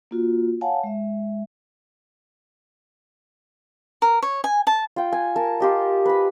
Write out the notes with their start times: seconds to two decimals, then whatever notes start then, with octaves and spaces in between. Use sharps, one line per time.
0.11 A#3 F4 F#4
0.61 C#5 F5 F#5 G#5 A5
0.83 G#3 E5
4.02 A#4
4.23 C#5
4.44 G#5
4.67 A5
4.96 F4 G5
5.13 G#5
5.36 A#4 A5
5.60 F4 G4 D#5
6.06 B4 B5